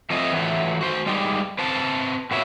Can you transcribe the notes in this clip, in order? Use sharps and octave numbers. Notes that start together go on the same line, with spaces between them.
F3 A3 C4 A4 D#5
E3 F#3 A3
F#4 C5
G3 G#3 D#4 G4 D5
C4 B4 C5 A5
A#2 F#4 B4 C#5 E5